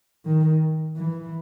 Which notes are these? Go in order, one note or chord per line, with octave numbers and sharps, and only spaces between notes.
D#3
E3